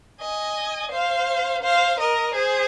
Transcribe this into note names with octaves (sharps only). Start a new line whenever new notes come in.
D#5 G#5
C5 F5
C5 F5
A#4 D#5
G#4 C5